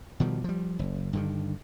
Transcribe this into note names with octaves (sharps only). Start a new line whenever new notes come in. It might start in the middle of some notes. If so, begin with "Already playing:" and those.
B2 D#3 F3 G3
F3 G3
F#1
G2 D3 D#3